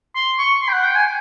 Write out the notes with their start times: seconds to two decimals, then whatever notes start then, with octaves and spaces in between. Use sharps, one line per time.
0.15 C6
0.39 C#6
0.62 C6
0.69 G5
0.73 F#5
0.84 G5
0.96 G#5